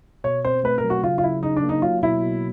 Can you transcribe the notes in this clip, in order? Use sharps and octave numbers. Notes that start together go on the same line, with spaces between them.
B2 C#5
C4 C5
A3 B4
A#4
F#3
F#4
C#3 F4
F4
C#3 E4
C#3 D#4
D4
A#3
D#4
F#3 F4
B2 E4
B2